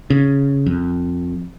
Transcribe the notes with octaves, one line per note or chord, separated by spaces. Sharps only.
C#3
F2